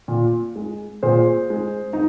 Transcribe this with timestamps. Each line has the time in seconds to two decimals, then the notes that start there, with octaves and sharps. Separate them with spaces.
0.08 A#2
0.56 G#3
1.03 A#2 G#4 C5
1.50 G#3
1.93 D#4